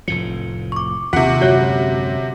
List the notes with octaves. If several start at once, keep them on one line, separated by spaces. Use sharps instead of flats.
F1 A2 F3 C#7
C#6 D6
D#2 C3 F4 F#5
F#2 D3 G#3 F#4 C#5 F#6